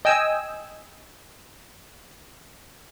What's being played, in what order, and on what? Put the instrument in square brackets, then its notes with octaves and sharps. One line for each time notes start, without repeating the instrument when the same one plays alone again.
[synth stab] D#5 G5 G#5 E6